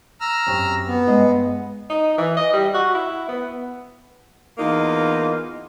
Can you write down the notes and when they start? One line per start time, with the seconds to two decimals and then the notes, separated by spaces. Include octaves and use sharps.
0.21 A#5 E6 F6
0.47 F#2 C4 G4
0.87 B3
1.07 G2 G#3 D#5
1.90 D#4
2.18 E3
2.37 D#5
2.53 G3
2.74 F#4
2.94 E4
3.28 B3
4.58 E2 A#3 D#4 F4